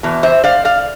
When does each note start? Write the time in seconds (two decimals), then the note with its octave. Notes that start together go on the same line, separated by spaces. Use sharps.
0.03 E2 B2
0.23 C5 E5
0.44 D5 F5
0.65 D5 F5